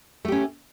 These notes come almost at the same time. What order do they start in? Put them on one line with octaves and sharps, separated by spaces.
A3 G4 C#4